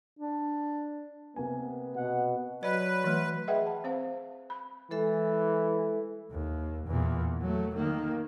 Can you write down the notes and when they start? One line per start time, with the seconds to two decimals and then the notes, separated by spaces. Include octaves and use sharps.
0.19 D4
1.36 C3 A#3 B3 G#5
1.96 B2 F#5
2.63 F#3 B4 D5 D#5
3.04 E3 A3
3.48 G#4 B4 D#5 E5 F#5 G5
3.66 A5
3.84 C4 C5 F5
4.50 B5
4.91 E3 G#3 A4 E5
6.31 D#2
6.86 E2 A#2
7.41 F#3 A3
7.74 D#3 A#3